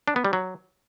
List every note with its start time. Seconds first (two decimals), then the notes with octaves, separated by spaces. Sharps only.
0.08 D4
0.16 B3
0.25 G3
0.33 F#3